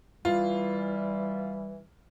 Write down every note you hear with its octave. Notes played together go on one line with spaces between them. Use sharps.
E3 G3 F4